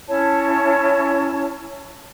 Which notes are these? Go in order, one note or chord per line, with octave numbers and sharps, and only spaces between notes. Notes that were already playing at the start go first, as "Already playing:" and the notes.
C#4 E4 C#5 A5